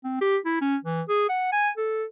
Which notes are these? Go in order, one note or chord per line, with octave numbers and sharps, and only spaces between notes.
C4
G4
E4
C#4
E3
G#4
F#5
G#5
A4